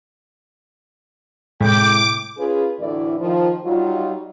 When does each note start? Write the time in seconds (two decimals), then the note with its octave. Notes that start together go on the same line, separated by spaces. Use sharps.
1.61 A2 C3 G#3 G5 D6
2.37 C#4 F4 G#4 B4
2.79 D2 A2 E3 E4 D5
3.20 D#3 F3
3.65 F#3 G3 D#4 F4